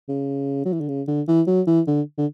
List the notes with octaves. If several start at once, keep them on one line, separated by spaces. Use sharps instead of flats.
C#3
F#3
E3
D3
C#3
D3
E3
F#3
E3
D3
D3